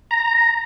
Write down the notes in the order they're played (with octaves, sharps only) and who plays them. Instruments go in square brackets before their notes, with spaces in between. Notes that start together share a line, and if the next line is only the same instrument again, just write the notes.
[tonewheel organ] A#5